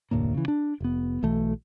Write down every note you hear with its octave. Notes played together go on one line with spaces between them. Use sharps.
F1 D2 A2 A#3
C#3 E3
D4
F1 B3
B1 E3 A3